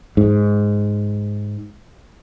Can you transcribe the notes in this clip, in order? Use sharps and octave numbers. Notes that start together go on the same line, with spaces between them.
G#2